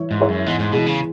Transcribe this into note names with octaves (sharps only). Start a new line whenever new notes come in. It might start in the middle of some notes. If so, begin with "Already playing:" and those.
Already playing: E3 E4 C#5
G#2
G#3 E4 C#5
F#2
E2 G#2
G#2
B2 E3 G#3
C#3